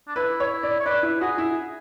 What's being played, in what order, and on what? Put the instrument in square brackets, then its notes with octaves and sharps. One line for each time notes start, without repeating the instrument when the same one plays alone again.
[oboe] D4
[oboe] E4 [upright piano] B4
[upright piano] C#5
D5
[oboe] C#5
[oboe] B4 [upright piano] D5
[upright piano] E4
[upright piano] F#4 [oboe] G#4
[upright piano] E4